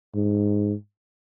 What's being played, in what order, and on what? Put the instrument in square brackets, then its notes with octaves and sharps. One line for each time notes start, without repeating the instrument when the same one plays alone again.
[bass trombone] G#2